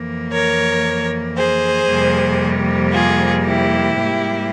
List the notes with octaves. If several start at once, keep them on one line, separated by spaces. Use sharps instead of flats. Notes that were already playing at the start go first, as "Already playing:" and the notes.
Already playing: F2 E3 A#3
A#4 C#5
G#4 C5
F2 C3 G3 A#3
F4 G#4
E4 G4
G#2 G3 A#3